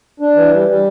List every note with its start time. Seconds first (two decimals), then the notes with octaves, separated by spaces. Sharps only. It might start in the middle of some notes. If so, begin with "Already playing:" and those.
0.20 D4
0.35 E3
0.52 G3
0.68 G3